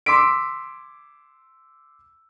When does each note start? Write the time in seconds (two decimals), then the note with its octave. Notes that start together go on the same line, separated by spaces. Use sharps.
0.06 C6 D6 E6 B6 D7